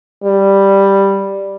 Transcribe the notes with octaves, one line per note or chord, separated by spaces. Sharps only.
G3